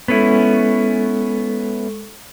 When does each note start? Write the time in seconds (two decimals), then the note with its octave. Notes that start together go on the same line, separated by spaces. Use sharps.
0.08 G#3 B3 C#4 E4 A4 C#6